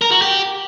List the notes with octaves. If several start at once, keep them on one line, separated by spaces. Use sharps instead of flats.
A#4
F#4
G4